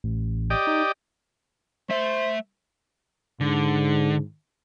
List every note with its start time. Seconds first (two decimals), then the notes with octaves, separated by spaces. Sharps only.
0.04 A1
0.50 G4 D5 D#5
0.67 D#4
1.89 A3 C5 E5
3.41 G#2 D3